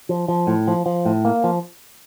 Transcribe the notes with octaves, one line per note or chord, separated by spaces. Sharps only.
F3
F3
A2
F3
F3
A2
A#3
F3